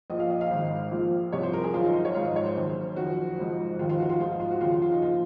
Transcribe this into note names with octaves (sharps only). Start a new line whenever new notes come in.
A#1 A#2 F3 D#5
F5
D#5
F5
G#1 G#2 D#3
A#1 A#2 F3
C2 C3 F3 C#5
C5
A#4
G#4
G#1 F#2 F3 F4
D#4
C5
C#5
G#1 G#2 F3 F5
D#5
C#5
C5
F#1 F#2 D#3
F#1 F2 D#3 F#4
G#1 G#2 F3
F1 D#2 D#3 F4
F4
F#4
F4
A#1 G#2 F3 F4
F4
F#4
D#2 C#3 F3 F4
F4
F4
D#4
A#2 F3 F4